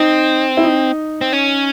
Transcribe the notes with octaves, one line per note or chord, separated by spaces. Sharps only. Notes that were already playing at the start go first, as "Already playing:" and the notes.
Already playing: C4 D#4
E4
D#4
C4
C#4